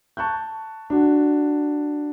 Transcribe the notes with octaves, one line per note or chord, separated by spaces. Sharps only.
A5 C#6 F#6 G6
D4 F#4